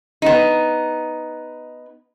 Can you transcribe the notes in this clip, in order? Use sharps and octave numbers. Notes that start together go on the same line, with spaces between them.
B3 D#4